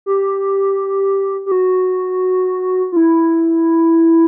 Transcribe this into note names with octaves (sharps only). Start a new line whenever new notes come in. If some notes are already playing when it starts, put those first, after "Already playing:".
G4
G4
F#4
F4
E4